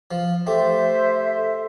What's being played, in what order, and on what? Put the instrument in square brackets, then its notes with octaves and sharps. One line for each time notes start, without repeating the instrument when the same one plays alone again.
[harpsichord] F3
[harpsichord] A3 G4 [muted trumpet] C5 [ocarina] E5